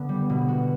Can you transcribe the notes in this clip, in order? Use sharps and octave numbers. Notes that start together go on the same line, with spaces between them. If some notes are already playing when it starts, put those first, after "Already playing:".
Already playing: D3 B3
G3
B2
F#4